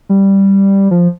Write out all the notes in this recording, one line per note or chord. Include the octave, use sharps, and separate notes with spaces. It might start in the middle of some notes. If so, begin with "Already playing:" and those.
G3
F3